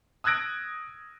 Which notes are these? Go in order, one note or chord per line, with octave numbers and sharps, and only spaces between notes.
D#6 E6 F#6 G#6 A#6 D7